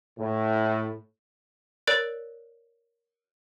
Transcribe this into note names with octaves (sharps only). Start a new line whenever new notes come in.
A2
A#4 C#5 D5 F#6 A6 D7